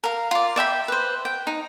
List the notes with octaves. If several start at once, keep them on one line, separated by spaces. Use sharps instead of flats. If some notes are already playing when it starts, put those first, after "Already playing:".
A#4 F5
F4 D5
D5 E5 G5 B5
B4 C5
G5
D#4